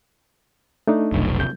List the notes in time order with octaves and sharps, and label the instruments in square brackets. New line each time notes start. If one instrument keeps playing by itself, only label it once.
[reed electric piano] A3 D4 D#4
[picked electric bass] F1 B1
[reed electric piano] C3 G6